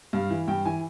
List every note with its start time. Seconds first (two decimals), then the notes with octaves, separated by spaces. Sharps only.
0.13 G2 F5
0.30 E3
0.48 G2 G5
0.65 E3 G#5